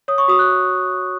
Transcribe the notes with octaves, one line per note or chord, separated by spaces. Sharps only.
C#5 D#6
C#6
F#4 D#6
F#6